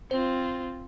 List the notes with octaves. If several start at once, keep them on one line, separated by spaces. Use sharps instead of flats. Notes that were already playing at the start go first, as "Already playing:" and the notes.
C4 F4 C5